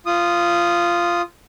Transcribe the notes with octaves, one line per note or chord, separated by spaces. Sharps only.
F4 D#6